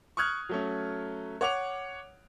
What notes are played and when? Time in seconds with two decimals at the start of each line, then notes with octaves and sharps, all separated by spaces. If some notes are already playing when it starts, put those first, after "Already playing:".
0.17 C#6 D#6 F6 F#6 G#6
0.49 F#3 A3 C#4
1.41 C#5 F#5 D6 F7